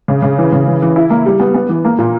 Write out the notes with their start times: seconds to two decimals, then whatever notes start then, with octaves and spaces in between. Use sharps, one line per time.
0.08 C#3
0.22 C#3
0.38 E3
0.53 C#3
0.68 E3
0.82 E3
0.96 E4
1.10 A#3
1.26 G3
1.40 B3
1.54 B3
1.69 E3
1.85 A#3
1.98 A#2